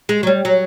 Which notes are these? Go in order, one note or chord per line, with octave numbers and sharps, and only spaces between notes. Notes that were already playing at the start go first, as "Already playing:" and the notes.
G#3
F#3
G3
F#3